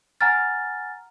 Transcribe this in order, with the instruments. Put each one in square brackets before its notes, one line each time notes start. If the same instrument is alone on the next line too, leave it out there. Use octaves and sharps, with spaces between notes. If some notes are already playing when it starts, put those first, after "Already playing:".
[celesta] F#5 G#5 A#5 F6 A6